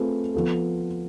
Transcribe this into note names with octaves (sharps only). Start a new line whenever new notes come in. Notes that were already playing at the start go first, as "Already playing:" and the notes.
Already playing: A3 C4 F4 G#4 B4
F3 B3 F4 A4